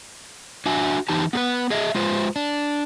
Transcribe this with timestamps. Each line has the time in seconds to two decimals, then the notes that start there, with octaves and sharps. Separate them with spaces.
0.66 D4 F#4 E5 G#5
1.09 E3 D#4 G4 A5
1.33 B3 G#4 B4
1.70 G#4 D#5 E5
1.95 G#3 F4 B4 C5
2.36 D4